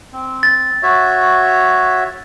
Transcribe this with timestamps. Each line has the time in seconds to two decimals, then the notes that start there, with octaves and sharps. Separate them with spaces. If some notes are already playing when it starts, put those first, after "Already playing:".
0.13 C4
0.43 A6
0.83 F#4 C#5 E5